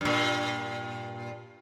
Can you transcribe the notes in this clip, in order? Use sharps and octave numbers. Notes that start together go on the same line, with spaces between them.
G2 A#2